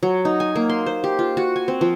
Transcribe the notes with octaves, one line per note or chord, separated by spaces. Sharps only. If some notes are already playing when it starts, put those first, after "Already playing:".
F#3
D#4
G#5
A#3
C6
C5
G4
F4
F#4
G#5
C4
F3